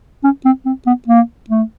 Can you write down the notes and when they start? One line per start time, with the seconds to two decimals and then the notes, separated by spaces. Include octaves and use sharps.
0.24 C#4
0.45 C4
0.66 C4
0.86 B3
1.08 A#3
1.50 A3